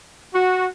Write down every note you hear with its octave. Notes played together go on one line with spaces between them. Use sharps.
F#4